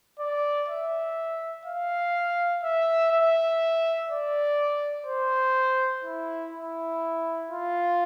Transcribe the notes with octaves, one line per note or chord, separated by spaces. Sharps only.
D5
E5
F5
E5
E5
D5
C5
E4
E4
F4